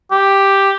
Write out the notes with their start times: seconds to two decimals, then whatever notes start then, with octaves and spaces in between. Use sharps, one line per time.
0.11 G4